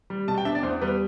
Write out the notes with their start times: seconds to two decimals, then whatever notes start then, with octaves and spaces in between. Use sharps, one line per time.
0.10 G3
0.28 B2 A5
0.38 G5
0.45 D4 E5
0.55 D5
0.63 E2 C5
0.81 G3 B4